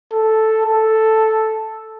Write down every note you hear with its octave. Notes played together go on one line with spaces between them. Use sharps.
A4
A4